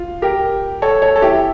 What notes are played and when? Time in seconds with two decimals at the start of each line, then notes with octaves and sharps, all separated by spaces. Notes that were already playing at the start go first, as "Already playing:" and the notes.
Already playing: F4
0.22 G4 A#4
0.82 A4 C#5
1.02 A4 C#5
1.16 A4
1.22 E4 G4